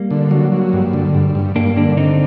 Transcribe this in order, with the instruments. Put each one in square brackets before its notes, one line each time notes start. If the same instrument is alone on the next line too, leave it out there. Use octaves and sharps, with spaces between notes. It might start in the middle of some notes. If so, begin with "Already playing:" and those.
Already playing: [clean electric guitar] G3 A#3
[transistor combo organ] D3
F#3
F#3
G2
D3
G2
G2
[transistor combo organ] G2 [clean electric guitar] A#3 D4
[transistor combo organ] D3 [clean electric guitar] A#3 D4
[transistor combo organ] D3 [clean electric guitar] C4 D#4